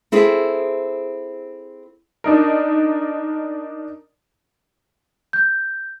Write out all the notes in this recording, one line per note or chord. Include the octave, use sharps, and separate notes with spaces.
C4 E4 G#4 A4
D4 D#4 A#4
G6